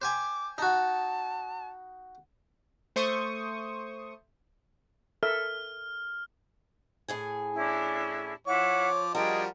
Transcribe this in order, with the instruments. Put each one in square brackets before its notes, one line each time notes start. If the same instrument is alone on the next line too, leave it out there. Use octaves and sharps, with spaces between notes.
[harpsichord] C5 G5 G#5 [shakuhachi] D6
[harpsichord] D#4 F#4 [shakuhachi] A5
[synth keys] A3 C5 C#6 D#6
[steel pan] A4 A#4 E5 [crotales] F6
[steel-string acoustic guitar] A2 G#4 G#5
[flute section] C#4 D4 E4
[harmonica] F3 D6 [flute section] E4 F#5 [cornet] C#5
[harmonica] F3 G3 A#4 [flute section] D4 G#4 G5 [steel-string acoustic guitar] F#4 [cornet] D#5